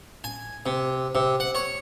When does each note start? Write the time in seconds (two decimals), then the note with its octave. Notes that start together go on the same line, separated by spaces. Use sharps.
0.24 G#5
0.66 C3
1.15 C3
1.40 F#5
1.55 C#5